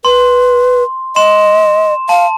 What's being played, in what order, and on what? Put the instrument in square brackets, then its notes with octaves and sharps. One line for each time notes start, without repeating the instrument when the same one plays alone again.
[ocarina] B4 [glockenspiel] C6
[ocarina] D#5 [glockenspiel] C6 E7
[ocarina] F5 [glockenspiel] A5